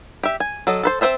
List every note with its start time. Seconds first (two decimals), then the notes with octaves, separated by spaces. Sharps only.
0.23 G4 E5
0.40 G#5
0.67 F#3 A4 D#5
0.83 A4 B4 C5
1.01 C4 B4 C5 E5 A5